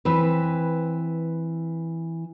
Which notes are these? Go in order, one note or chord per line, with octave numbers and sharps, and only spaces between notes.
E3 C4 B4